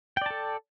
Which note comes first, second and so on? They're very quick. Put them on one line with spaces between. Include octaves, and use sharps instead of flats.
G5 D5 A5 A4